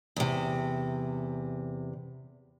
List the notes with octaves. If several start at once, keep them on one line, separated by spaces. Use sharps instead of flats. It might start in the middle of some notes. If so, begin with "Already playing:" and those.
E2 C3